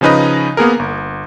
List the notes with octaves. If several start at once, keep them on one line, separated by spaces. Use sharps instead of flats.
C#3 F3 C#4 D#4 B4 D#5
A#3 B3 G#4 A#4
G1